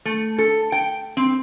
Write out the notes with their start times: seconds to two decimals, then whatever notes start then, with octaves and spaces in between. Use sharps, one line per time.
0.05 A3
0.38 A4
0.72 G5
1.17 C4